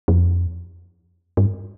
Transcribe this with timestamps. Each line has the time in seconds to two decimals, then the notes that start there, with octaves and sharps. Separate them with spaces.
0.08 F2
1.37 G2